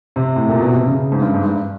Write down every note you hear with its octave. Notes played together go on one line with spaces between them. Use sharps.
C3
A2
A#2
B2
C3
C#3
G#2
G2
G#2
G2